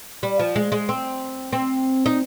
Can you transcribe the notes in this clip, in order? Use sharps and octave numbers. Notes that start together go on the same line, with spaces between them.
G3
F3
G#3
G#3
C4
C4
D#4